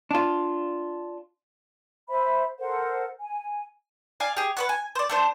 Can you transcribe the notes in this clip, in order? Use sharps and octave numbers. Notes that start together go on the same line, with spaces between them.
D4 F4
C5 E5 B5
A4 A#4 C5 F#5
G#5
D5 F5 G#5
G4 G#4
B4 C#5 F#5
G#5
C5 D5
A3 D4 C5